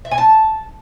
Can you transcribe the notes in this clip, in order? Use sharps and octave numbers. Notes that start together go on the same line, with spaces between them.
E5
G#5
A5